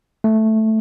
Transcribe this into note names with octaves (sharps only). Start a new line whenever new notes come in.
A3